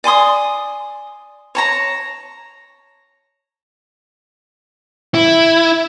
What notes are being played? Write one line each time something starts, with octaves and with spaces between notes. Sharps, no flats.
D5 G#5 C6 D#6
C#5 A5 A#5
E4